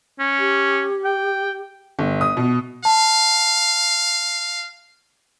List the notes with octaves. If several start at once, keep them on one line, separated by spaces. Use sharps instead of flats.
C#4
G4
G5
G1
D#6
B2
F5 A5